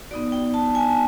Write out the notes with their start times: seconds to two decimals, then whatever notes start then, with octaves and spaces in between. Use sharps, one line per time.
0.11 B3 D#4 F#4 D5
0.32 G5
0.54 A5
0.75 G#5